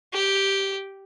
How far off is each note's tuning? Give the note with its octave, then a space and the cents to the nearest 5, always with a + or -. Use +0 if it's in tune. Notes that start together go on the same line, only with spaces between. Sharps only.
G4 -5